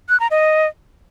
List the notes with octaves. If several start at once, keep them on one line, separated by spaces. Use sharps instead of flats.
F#6
A#5
D#5